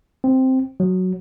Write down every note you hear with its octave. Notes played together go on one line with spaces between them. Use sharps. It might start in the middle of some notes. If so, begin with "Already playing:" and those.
C4
F#3